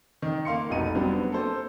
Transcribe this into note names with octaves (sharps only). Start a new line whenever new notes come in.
D#3
A#3 F5 C6 C#7
F1 B1 D#4 D#7
F#3 G3 B3 C4 D4
A#3 A4 C5